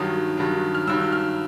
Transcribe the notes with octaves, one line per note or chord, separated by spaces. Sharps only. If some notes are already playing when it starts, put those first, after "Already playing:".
Already playing: G2 D#3 F#3 D#6
G2 D#3 F#3
F6
G2 D#3 F#3 E6
F6